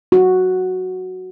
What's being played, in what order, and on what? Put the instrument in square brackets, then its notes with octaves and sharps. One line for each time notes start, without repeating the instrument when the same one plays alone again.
[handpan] F#4